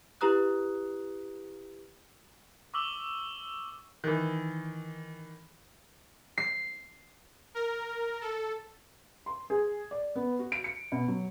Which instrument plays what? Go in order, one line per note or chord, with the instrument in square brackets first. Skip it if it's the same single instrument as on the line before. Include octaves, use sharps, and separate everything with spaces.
[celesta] E4 G4 B4 A#5 D#6 F#6
[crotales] C#6 D6 E6 F#7 G7
[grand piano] D#3 E3
[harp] C7
[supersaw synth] A#4
A4
[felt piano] C6
G#4
D5
B3
F#4
D7
C#7
B2
F#3